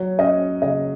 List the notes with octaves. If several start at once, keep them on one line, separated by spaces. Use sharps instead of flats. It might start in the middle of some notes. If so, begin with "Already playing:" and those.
Already playing: F#3 C#5
C#4 D#5
C#3 D#5